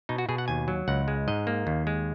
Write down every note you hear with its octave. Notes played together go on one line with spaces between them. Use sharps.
B2 D#4
F#4
B2 G#4
F#5
D#2 G#5
F#3
C#2 F#5
G#3
G#2 D#5
A#3
D#2
G#3